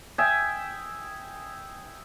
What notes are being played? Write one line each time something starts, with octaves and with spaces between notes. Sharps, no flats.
D#5 E5 G5 G#5